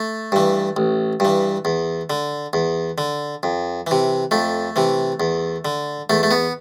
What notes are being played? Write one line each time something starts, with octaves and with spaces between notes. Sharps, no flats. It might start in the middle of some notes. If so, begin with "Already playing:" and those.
Already playing: A3
G2 E3
A1
G2 E3
E2
D3
E2
D3
F2
C3 E3
F2 A3
C3 E3
E2
D3
E2 A3
A3
B3